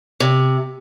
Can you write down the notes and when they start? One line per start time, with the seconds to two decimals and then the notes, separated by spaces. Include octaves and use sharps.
0.20 C3